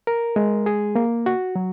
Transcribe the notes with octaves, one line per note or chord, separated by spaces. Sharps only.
A#4
G#3
G#4
A#3
F#4
F#3